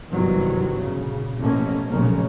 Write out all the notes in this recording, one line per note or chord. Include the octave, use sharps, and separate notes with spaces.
G1 C3 D#3 E3 F#3
A#2 C#3
A1 F2 B2 A3 A#3 C#4
F1 B1 A#2 C#3 A#3 C#4